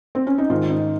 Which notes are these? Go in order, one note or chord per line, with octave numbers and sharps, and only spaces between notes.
C4
C#4
D#4
G#2 D#3 F4
D#4